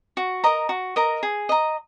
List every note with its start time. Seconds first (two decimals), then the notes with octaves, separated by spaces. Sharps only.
0.17 F#4
0.44 A#4 D#5 A#5
0.69 F#4
0.96 A#4 D#5 A#5
1.23 G#4
1.49 D#5 A#5